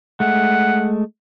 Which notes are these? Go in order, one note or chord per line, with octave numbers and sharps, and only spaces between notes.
G#3 A3 F#5